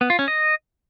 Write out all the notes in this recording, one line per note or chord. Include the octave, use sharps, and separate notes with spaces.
B3
F4
C#4
D#5